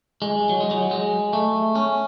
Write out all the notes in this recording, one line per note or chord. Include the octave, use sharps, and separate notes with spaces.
G#3
F#3
G#3
F#3
G#3
A3
C#4